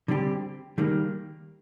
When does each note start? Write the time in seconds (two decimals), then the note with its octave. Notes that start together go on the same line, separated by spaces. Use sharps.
0.08 D3 G3 C4 G4
0.78 D#3 G3 A#3